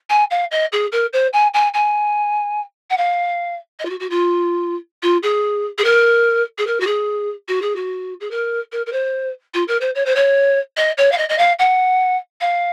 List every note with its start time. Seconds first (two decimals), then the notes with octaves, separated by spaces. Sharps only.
0.09 G#5
0.30 F5
0.51 D#5
0.72 G#4
0.92 A#4
1.13 C5
1.33 G#5
1.54 G#5
1.74 G#5
2.90 F#5
2.97 F5
3.79 D#5
3.85 F4
3.90 F#4
4.00 F#4
4.10 F4
5.02 F4
5.23 G#4
5.78 G#4
5.84 A#4
6.58 G#4
6.67 A#4
6.80 F#4
6.87 G#4
7.48 F#4
7.62 G#4
7.76 F#4
8.20 G#4
8.31 A#4
8.72 A#4
8.86 A#4
8.92 C5
9.54 F4
9.68 A#4
9.81 C5
9.95 C#5
10.06 C5
10.15 C#5
10.77 D#5
10.97 C#5
11.12 F5
11.18 D#5
11.29 D#5
11.38 F5
11.59 F#5
12.41 F5